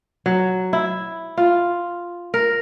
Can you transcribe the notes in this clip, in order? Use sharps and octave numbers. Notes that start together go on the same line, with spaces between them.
F#3
E4
F4
A#4